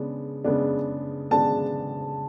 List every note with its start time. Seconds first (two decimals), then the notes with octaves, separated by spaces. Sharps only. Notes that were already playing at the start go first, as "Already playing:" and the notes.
Already playing: C#3 G#3 B3 D4
0.44 C#3 G#3 B3 D4
1.31 C#3 G#3 B3 D4 A5